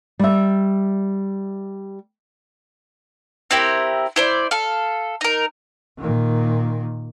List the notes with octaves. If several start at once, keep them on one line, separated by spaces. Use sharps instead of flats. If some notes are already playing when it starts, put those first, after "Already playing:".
G3 E5
C4 E4 G4 A#4
E4 C5 D5
A4 F5
D#4 A#4
A#2 D#3